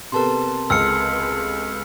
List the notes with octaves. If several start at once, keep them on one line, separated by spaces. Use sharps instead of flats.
C3 B3 A4 A#4 A5 C6
C#2 E6 F6 C#7